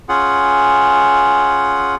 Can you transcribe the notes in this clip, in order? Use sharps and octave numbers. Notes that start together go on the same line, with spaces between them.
C#4 F4 G#4 F#5